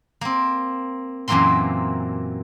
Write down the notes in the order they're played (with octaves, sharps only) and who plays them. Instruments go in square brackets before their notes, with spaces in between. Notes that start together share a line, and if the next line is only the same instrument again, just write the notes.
[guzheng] A#3 C4
F#2 A#2 E3 A#3 C4 C6